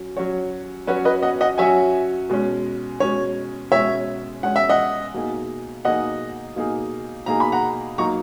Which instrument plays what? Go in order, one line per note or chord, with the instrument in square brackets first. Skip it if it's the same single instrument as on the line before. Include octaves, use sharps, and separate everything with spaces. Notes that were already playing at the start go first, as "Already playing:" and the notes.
Already playing: [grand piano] F#3 C#4 F#4
F#3 C#4 F#4 C#5
[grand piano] F#3 C#4 F#4 C#5 [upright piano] B4
[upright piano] B4 D#5
D#5 F#5
D#5 F#5
[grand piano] F#3 C#4 F#4 C#5 [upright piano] E5 G#5
[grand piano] B2 G#3 C#4
[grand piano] B2 G#3 C#4 [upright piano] C#5
[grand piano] B2 G#3 C#4 [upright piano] C#5 E5
[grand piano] B2 G#3 C#4 [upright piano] F#5
[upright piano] E5
D#5 F#5
[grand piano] B2 A#3 D#4 G#4
[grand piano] B2 A#3 D#4 G#4 [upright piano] D#5 F#5
[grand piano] B2 A#3 D#4 G#4
[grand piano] B2 A#3 D#4 G#4 [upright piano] A#5
[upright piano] B5
F#5 A#5
[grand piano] F#3 A#3 D#4 [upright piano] A#5 C#6